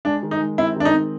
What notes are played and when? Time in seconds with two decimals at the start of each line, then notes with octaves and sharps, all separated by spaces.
0.05 G#3 D4
0.23 D#3
0.31 D#4
0.40 G#3
0.58 C4 E4
0.76 D#3 D4
0.85 D#4
0.94 C4